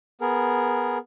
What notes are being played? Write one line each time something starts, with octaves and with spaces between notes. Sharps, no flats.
B3 G#4 A#4